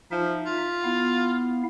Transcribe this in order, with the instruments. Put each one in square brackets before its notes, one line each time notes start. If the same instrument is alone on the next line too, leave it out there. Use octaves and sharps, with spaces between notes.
[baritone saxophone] F3 [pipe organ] D#4 E5
[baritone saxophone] F4
[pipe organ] B3 E4 F5